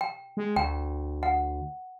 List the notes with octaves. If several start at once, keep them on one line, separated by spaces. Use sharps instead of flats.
G5
G#3
D2 G5
F#5